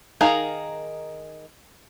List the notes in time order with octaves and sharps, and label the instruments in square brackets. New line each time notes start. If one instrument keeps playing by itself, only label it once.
[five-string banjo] D#3 D#4 G#4 A#4 F5